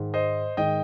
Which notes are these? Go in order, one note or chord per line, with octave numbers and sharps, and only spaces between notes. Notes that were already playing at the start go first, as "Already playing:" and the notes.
Already playing: G#2 D#3 G#3
C5 D#5
G#2 D#3 G#3 D#5 G5